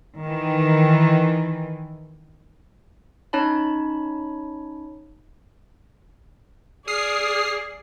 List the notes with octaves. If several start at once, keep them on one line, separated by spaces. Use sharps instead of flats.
D#3 E3
C#4 D#4 C#5 A5 B5
G#4 D5 D#6 F6 C7